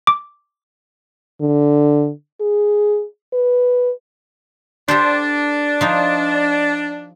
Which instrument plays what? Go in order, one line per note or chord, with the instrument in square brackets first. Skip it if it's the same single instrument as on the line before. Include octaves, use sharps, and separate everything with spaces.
[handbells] D6
[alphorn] D3
G#4
B4
[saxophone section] D4 [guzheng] G4 A4 C5
[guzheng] F3 D#4